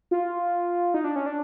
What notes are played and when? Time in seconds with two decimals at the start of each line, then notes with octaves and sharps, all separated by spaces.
0.11 F4
0.94 D#4
1.04 D4
1.16 C#4
1.26 D4